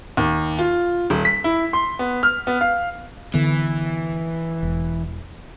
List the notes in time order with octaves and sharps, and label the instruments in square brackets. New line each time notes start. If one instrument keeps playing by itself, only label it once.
[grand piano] D#2
F4
D#1
B6
E4
C6
B3
F6
B3
F5
[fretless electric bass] D3 B3 [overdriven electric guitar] E3
[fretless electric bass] E1